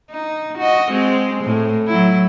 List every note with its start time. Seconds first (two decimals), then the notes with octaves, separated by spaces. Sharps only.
0.11 D#4
0.58 F#4 D#5
0.91 G#3 C4
1.44 A2
1.87 F#3 E4